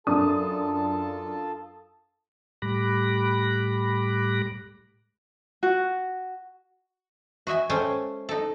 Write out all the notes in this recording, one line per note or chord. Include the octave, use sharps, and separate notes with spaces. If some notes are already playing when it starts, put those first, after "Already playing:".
F#2 D4 F4 A4 A5 D#6
A2 G3 B5 D6 F#6 A#6
F#4
F#4 D#5 E5 G#5
G#3 C#4 A4 C5 G5 G#5
D#4 A4